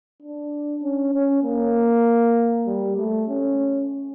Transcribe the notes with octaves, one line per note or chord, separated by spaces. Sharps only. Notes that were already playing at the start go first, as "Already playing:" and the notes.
D4
C#4
C#4
A#3
G3
A3
C#4